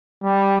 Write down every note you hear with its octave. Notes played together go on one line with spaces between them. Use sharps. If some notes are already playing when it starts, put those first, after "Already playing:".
G3